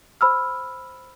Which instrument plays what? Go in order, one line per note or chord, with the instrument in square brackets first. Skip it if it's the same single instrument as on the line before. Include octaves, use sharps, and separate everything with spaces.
[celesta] C5 B5 E6 F6